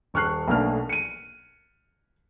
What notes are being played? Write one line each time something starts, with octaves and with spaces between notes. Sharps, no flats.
D#1 C#6 F6 F#6 C7
B1 B2 A3 A#3 D4 F6
C#7 D#7